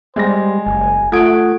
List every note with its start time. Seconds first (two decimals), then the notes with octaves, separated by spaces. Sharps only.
0.16 G3 G#3 C5 A#6
0.67 F#1 G#5
1.12 A3 F4 A4 F#5 D#6 G#6 D7